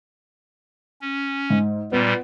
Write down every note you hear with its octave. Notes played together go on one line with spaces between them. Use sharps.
C#4
G#2
A#2 G3 B3